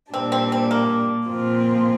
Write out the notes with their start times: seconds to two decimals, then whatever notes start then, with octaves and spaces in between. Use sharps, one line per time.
0.13 A#2 G3 C4 D4
0.32 C4
0.52 C4
0.71 A#3
1.28 A#2 F3 C4 F4